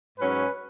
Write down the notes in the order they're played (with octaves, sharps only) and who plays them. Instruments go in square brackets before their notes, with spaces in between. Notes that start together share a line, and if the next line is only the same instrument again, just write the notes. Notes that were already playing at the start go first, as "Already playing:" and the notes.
[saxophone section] G#2 F#3 C#4 [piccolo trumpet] B4